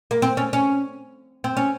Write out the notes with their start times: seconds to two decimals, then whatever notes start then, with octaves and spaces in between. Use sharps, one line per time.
0.11 A#3
0.22 C4
0.37 C#4
0.53 C#4
1.44 C4
1.57 C#4